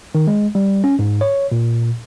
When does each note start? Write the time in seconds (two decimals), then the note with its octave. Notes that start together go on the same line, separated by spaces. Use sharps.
0.15 D#3
0.27 G#3
0.55 G3
0.84 C#4
0.99 G#2
1.21 C#5
1.52 A#2